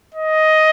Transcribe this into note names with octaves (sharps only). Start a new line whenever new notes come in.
D#5